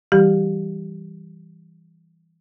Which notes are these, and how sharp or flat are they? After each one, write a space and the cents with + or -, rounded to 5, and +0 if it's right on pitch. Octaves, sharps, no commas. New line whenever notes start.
E3 +0 G3 +0 G4 -10